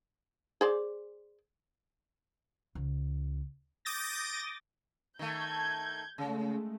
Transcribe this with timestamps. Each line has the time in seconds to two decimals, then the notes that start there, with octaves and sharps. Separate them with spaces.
0.61 G#4 C5 D5
2.75 C#2
3.85 D6 D#6 G6 A6 A#6
5.19 D#3 A3 G6 G#6
6.18 C#3 G#3 A3